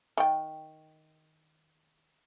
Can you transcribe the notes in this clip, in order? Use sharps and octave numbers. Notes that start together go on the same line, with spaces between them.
D#3 G5